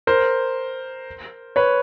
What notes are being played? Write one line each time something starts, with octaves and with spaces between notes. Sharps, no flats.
A#4 C5
B4 C#5